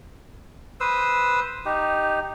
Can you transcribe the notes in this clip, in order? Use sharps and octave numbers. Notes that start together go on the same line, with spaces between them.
B4 C5 D#6 E6
D#4 G4